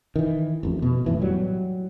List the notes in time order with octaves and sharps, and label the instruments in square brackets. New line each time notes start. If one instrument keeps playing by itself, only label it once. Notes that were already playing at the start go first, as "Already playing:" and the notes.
[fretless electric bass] D#3 E3
A1 F2
B2
F2 A2 E3
F#3 G3